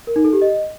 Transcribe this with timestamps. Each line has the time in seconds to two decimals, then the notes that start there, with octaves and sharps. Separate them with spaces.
0.07 A#4
0.16 D#4
0.24 A4
0.33 G4
0.42 D#5